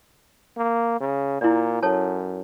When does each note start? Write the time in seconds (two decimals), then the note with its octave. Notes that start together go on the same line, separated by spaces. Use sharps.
0.58 A#3
1.00 C#3
1.41 A#2 E4 D5
1.83 F#2 A4 C#5 A5